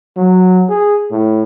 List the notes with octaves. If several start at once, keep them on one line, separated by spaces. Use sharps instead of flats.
F#3
G#4
A2